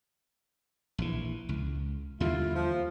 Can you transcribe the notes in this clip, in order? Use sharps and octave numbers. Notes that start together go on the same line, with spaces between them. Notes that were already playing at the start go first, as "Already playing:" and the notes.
A#1 E3
C#2
D#2 D3 G3 E4 F4
F3